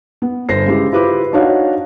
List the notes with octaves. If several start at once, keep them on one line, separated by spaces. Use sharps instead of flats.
B3
G1 C5 A#6 C7
C#3 G#3 E4 G4
E4 F4 G4 B4 C5 D6
D4 D#4 F#4 C#5 F5 F#5